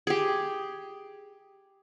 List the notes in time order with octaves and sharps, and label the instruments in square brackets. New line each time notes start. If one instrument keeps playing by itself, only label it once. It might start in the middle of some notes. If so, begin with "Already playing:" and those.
[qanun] G4 G#4